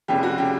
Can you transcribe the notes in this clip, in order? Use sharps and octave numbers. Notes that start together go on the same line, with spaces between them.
F1 F2 C#3 G4
F#4
C#3 G4